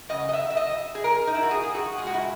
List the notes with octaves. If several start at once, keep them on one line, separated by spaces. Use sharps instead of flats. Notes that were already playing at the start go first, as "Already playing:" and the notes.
C#3 F#3 D#5
D#5
E5
E5
D#5
G#4
A#4
D#4
E4
F#4
G#4
G#4
F#4
A#2 G#3 G#4
F#4
E4